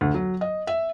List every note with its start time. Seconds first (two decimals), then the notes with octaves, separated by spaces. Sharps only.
0.01 D2
0.14 F#3
0.41 D#5
0.67 E5